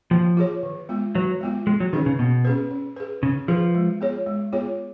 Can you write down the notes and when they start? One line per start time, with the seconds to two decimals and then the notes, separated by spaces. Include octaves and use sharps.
0.11 F3 A#3
0.37 F4 G#4 C#5
0.63 D#3
0.89 G#3 B3 F4
1.15 D#3 F#3
1.41 G#3 B3 F4
1.67 G#3 A#3
1.80 F#3
1.93 D#3 C#4 G#4 B4
2.06 C#3
2.19 B2 A#3
2.45 C#4 G#4 B4
2.71 C#4
2.96 G#4 B4
3.23 C#3 C#4
3.48 F3 G#4 B4
3.75 G#3
4.01 B3 F4 G#4 C#5
4.26 G#3
4.53 B3 F4 G#4 C#5